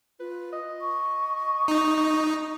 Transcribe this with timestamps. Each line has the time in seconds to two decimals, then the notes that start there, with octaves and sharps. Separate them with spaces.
0.20 F4 B4
0.53 D#5
0.81 C#6
1.68 D#4